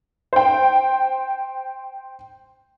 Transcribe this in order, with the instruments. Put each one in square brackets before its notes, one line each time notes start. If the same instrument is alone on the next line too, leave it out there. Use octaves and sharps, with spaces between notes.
[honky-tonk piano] C5 G5